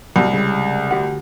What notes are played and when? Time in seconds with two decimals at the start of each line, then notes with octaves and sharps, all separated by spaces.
0.16 C2 F#3 G3
0.33 C#3 G3 G#3
0.91 D2 G4 F#5